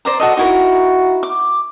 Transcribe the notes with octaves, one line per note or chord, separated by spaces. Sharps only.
C5 D5 A#5
F#4 A4 D#5
D#4 E4 F#4 A#4
D6